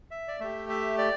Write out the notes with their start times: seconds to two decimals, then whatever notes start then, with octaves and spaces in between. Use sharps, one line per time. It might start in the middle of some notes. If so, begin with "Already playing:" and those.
0.11 E5
0.28 D5
0.40 A3 G4 E5
0.69 E5
0.98 D5